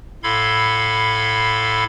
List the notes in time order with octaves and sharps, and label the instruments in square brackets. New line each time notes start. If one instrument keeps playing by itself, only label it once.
[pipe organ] A2 A4 F5 B5 C6 G#6